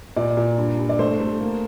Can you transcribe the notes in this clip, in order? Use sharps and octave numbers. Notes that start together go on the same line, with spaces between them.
A#2 D5
A#2
G2
G2
D5
A3 C5
A3
A#3